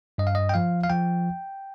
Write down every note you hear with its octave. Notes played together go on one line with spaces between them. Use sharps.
G2 D#5
F5
D#5
G5
F3 F5
F5
F3 G5